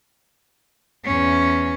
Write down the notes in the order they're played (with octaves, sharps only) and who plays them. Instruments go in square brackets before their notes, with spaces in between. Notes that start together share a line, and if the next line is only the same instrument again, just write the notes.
[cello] E2 C#4